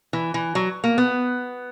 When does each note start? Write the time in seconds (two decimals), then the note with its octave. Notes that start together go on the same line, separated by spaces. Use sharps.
0.13 E3
0.34 E3
0.55 F#3
0.84 A#3
0.98 B3